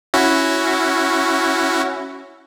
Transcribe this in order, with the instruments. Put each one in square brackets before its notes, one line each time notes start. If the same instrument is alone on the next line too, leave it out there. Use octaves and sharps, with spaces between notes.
[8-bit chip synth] C#4 E4 F#4